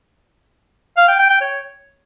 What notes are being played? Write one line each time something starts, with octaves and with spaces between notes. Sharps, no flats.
F5
G5
G5
G5
C#5